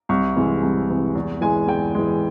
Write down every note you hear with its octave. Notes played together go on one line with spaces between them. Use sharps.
C2 C#6
C3 E3 G#3
C2
C3 E3 G#3
E2
E3 G#3 G#5
E2 G5
E3 G#3